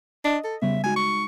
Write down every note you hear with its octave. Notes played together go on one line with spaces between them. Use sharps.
D4 D#5
A4
C#3 G3 B3 E5
G#3 D#4 F#4 G#5
C#6